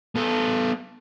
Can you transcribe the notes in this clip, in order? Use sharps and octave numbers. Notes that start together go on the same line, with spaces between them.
B3 A4